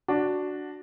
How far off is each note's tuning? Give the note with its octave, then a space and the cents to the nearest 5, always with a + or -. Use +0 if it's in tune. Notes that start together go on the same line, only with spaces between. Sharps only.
D4 +0 F#4 +0